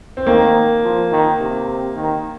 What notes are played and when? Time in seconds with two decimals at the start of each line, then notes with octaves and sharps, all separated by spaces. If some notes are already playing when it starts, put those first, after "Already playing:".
0.17 C4
0.27 D#3 A#3
0.83 F3
1.12 D#3
1.40 C3
1.96 D#3